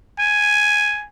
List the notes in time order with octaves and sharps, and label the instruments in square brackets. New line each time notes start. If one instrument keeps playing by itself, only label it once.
[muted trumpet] G#5